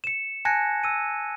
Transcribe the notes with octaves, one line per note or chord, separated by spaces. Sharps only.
C#7 E7
G#5 A5 F#6 G#6 A#6 C#7
E6 D#7